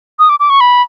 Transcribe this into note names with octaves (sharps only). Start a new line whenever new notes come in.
D#6
D6
D6
C#6
B5